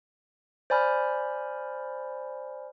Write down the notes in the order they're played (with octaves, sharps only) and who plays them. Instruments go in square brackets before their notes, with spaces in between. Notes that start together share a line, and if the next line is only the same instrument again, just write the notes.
[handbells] C5 D5 G#5 B5 F6